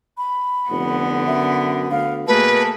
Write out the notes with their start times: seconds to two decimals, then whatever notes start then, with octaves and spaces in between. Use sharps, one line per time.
0.18 B5
0.70 F1 D3 B3
1.27 F#2 E5
1.91 D2 F5
2.27 B2 A3 A#3 G#4 B4 A5